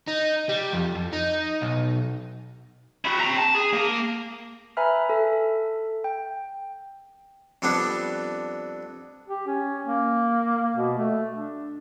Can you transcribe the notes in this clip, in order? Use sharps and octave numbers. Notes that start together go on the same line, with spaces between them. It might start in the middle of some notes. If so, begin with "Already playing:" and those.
D#4
G3
F2
F2
D#4
B1
E4 F#4
C4 A#5
A5
G#4
A#3
B4 E5 G#5 A#5 B5 F6
A4 E5
G5
F2 G3 B3 D4
G4
C#4
A#3
B2
A3
D4